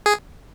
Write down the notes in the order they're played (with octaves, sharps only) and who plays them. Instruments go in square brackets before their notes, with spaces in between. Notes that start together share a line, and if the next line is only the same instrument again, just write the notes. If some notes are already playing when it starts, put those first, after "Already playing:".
[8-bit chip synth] G#4